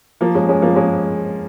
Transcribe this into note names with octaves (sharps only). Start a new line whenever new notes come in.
F3 A#3
G#3 C#4
G#3 C#4
F3 A#3
G#3 C#4